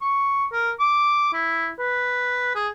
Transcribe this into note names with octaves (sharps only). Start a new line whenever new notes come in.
C#6
A#4
D6
E4
B4
G#4